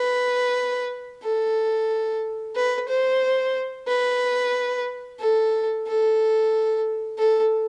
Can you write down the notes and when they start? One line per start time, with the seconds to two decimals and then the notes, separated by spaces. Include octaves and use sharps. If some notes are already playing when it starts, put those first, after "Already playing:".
Already playing: B4
1.23 A4
2.55 B4
2.89 C5
3.88 B4
5.20 A4
5.87 A4
7.18 A4